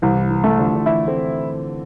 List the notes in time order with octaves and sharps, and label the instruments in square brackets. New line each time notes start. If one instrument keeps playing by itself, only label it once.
[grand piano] C2 [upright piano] E3
[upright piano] E3
[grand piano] A3
[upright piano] D3 F3
D3
[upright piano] E3 [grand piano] E4
[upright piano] A3 C4